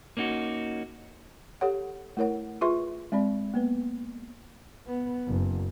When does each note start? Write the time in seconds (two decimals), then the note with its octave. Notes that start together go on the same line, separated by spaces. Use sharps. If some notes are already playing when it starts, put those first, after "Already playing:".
0.17 A#3 C#4 D#4 F#4
1.61 G4 A4 C#5 F#5
2.17 A3 E4 A#4 C#5 F#5
2.61 F4 G#4 B4 E5 C6 C#6
3.12 G#3 C4 D5 B5
3.54 A#3 B3 B4
4.87 B3
5.28 F#1